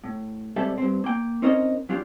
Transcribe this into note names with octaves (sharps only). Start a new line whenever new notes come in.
A2
C3 G3 G#3 A4 C5 E5
G2 C4
A#3 G5
C4 C#4 D#4 A#4 C5 D#5
F#3 D4 F4 G4